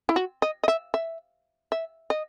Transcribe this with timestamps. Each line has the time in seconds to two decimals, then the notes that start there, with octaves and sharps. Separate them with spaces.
0.09 E4
0.16 F#4
0.42 D#5
0.63 D#5
0.68 E5
0.94 E5
1.72 E5
2.10 D#5